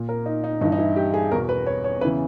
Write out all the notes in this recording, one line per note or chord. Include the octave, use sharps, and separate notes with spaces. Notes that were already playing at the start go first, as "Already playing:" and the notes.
Already playing: A#2
A#4
D#4
D#4
G2 E3 D#4
D#4
E4
G4
G#4
E2 B2 A#4
B4
C#5
C#5
E2 C#3 E3 B4